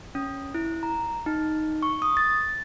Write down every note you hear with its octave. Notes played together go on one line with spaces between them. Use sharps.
C#4
E4
A#5
D#4
C#6
D#6
A6